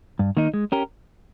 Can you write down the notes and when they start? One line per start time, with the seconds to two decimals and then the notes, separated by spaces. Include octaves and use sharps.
0.19 G2
0.37 D#3 A#3 D#4
0.54 G#3
0.72 C#4 G4 A#4